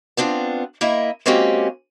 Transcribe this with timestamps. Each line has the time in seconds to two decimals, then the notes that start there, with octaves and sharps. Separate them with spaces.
0.17 B3 C4 D4 F4
0.81 A#3 E4 D#5 E5
1.26 G#3 A#3 C4 C#4 F#4 G4